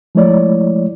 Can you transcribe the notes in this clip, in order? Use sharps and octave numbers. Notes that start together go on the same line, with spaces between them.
F3 G#3 A3 E4 C#5 D5